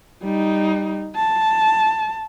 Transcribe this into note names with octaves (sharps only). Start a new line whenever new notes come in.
G3 D#4
A5